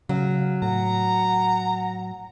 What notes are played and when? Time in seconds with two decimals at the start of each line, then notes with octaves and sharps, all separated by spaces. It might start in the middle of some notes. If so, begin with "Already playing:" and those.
0.09 C#3 F#3 F5
0.62 A2 F#5 A#5